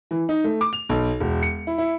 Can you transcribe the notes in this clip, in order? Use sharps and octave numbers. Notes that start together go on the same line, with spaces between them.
E3
D#4
A3
D6
F7
B1
E1
C#7
E4
E4